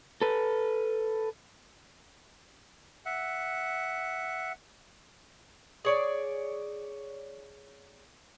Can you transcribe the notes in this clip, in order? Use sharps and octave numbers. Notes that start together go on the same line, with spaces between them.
A4 B4
E5 F#5
G#4 C#5 D5